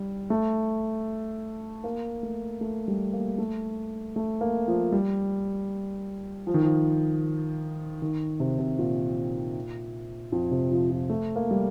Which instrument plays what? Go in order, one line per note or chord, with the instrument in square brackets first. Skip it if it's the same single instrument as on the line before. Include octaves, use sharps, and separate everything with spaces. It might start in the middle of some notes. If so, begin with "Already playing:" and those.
Already playing: [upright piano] G3
A3
A#3
A3
A3
G3
A#3
A3
A3
A#3
F3
G3
F3
D#3
F3
D#3
C3
C3
A#2
F2
C3
F3
F3
A3
A#3
G3